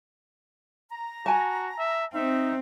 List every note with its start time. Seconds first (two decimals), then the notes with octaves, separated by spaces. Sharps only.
0.90 A#5
1.26 F#4 G#5 A5
1.78 E5
2.14 C4 D#4 E5